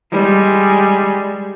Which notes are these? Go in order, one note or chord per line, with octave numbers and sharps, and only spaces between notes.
G3 G#3